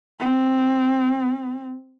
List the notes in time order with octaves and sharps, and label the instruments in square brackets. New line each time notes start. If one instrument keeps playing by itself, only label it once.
[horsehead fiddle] C4